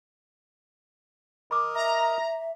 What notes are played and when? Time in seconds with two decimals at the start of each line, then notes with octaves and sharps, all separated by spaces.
1.51 A#4 D#5 B5 D6
1.75 E5 A#5